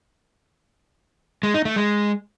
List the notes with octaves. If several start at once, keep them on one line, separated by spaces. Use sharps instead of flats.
G#3
D#4
A3
G#3